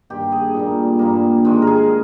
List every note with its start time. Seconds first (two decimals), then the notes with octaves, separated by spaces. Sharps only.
0.10 G2 D#3 A#3 G4
0.32 G#4
0.54 A#2 G3 A#3
0.99 G2 G3 A#3
1.45 G#2 D#3 G#3
1.62 A#4
1.67 G#4